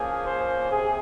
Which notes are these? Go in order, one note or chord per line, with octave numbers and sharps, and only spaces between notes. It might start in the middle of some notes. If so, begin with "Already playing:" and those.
Already playing: A#2 F3 A#3 C#4 G#4
C5
C3 G#4